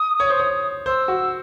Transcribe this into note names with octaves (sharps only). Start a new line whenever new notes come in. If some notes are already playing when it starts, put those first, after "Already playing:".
Already playing: D#6
C#5
C5
C#5
C5 E6
F#4